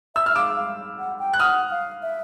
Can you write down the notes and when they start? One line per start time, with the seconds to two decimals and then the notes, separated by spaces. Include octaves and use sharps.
0.15 E5 E6
0.26 E5 F6
0.35 F5 D6 E6
0.57 F5
0.99 F#5
1.19 G5
1.33 F#6
1.39 F#5 D#6 F6
1.71 F5
2.03 E5